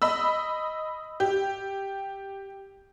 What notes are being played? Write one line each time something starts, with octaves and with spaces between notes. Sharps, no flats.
D#5 B5 E6
G4